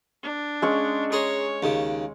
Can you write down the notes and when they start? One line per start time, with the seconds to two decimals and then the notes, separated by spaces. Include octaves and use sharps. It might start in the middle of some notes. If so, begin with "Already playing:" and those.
0.23 D4
0.62 G#3 C#4 C#6
1.12 G#4 C#5 A#5 C6
1.63 D#2 C#3